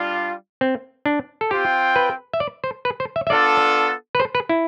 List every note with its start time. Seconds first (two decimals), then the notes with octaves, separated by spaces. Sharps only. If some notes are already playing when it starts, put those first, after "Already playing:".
Already playing: G3 D4 F4
0.61 C4
1.06 D4
1.41 A4
1.51 C4 F4 G4 C5 G5
1.96 B4
2.33 E5
2.40 D5
2.64 C5
2.85 B4
3.00 C5
3.16 E5
3.27 E5
3.30 B3 D4 F4 A4 D5
4.15 B4
4.20 C5
4.35 B4
4.49 E4